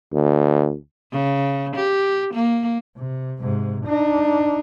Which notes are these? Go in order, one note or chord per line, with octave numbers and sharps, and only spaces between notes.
D2
C#3
G4
A#3
C3
G#2 C3
D4 D#4